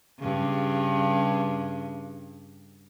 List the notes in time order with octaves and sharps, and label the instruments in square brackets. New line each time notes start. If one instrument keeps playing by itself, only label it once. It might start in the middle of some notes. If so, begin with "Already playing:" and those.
[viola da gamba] G2 C#3